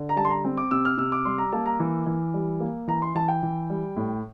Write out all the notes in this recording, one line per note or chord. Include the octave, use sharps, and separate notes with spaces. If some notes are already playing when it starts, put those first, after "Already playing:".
Already playing: D3
A#5
G3 A5
C6
A#5
C4
D6
C3 E6
F6
C3 E6
D6
G3 C6
A#5
A#3 A5
A#5
E3
E3
G3
A#3
E3 A#5
C6
E3 A5
G5
E3
G3
A2